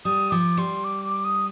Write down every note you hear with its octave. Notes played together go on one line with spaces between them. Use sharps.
G3 D#6
F3 D6
G3 C6
D6
D6
D#6